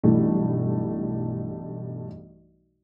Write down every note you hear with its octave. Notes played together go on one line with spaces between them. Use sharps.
B1 G2 E3 A3